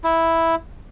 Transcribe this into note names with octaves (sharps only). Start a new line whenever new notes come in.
E4